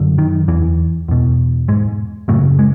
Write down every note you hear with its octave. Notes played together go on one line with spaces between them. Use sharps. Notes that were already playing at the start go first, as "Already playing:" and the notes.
Already playing: F#2 D3
D#3
E2 E3
E2 B2
G#2 G#3
F#2 A2 C#3 A3
G#3